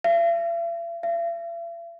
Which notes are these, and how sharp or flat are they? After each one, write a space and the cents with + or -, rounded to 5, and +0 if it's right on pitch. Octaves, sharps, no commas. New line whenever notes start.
E5 +45
E5 +45